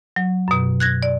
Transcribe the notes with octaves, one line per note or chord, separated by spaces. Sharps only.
F#3
F#2 B2
F#6 G#6 A#6
D5